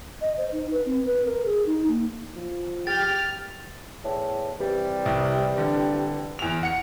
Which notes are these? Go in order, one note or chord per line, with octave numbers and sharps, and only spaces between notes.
D#5
C5
D#4
B4
C4
B4
A#4
G#4
D#4
A#3
F3
G4 F6 A6
E2 A2
C3 E3 G3
C2
D3
E2 F7
F#5 C#7